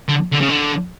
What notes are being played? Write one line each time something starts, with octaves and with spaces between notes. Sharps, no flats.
D3
D3
C#3
D3